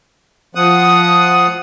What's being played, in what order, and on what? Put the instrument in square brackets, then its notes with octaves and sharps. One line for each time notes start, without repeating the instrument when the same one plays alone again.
[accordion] F3 F#5 D#6